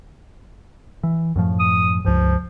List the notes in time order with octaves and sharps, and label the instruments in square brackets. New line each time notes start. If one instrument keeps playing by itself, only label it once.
[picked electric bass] E3
F#2 A2 F3
[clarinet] D#6
[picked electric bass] C#2 G2 [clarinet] F3